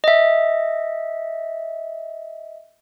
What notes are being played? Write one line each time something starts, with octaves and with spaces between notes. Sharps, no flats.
D#5 E5